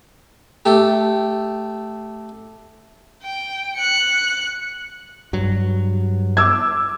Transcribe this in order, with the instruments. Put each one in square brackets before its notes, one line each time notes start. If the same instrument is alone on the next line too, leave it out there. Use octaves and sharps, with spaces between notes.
[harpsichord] A3 G4
[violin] G5
F#6 C#7
[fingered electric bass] G2 F#3
[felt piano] D6 E6 G#6